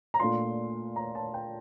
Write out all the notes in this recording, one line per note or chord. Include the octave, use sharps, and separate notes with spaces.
A#5
A#2 A3 D4 F4 C6
A#5
A5
G5